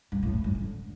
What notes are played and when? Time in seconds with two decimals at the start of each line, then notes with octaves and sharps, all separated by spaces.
0.12 G2
0.23 A2
0.33 E2
0.44 G2
0.55 D3